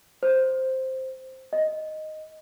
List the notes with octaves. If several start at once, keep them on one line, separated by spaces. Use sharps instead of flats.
C5
D#5